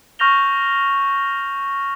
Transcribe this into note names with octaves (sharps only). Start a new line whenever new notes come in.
C#6 F6 G6 A#6 F7 G7